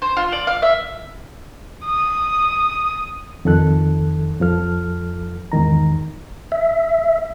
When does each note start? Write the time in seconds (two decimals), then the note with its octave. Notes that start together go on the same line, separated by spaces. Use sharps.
0.02 C5
0.17 F4
0.32 D5
0.47 F5
0.62 E5
1.85 D#6
3.45 F2 D#3 A4 F#6
4.41 F2 F3 A4 F6
5.52 E2 G#2 D#3 A#5
6.52 E5